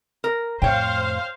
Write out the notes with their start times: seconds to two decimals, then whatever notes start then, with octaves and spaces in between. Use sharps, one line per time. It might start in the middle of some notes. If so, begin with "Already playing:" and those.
0.24 A#4
0.62 F2 A2 C5 C#5 F5 G5